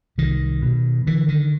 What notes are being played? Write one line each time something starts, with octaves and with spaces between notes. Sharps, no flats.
C2 D#3
B2
D3 E3
D#3